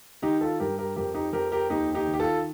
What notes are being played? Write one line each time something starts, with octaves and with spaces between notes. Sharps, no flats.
D#3 D#4 G4
F4 A4
G2 G4 A#4
G4 A#4
F2 G4 A#4
D#4 G4
F2 G4 A#4
G4 A#4
D#2 D#4 G4
D#4 G4
D#3
G4
F4 A4